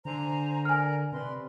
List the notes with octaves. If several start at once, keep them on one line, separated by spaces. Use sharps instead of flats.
D3 C5 G#5 A#5
A#4 D5 G#5 F6
C3 B4 D5 C6